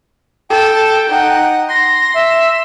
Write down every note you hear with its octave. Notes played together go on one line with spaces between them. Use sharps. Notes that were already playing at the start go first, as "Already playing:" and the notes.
A4 G5
D#4 F#5
C6 A#6
E5